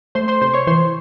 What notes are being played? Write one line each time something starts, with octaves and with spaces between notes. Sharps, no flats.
A3 C5 C6
C5 C6
C3 C5 C6
C#5 C#6
E3 C5 C6